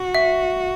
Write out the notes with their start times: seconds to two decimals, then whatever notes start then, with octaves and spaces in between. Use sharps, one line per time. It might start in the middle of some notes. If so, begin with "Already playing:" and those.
Already playing: F#4
0.15 E5